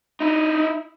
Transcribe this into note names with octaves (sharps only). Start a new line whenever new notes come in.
D#4 E4